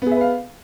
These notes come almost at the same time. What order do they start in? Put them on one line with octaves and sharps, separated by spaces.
B3 G#4 E5 B4 F5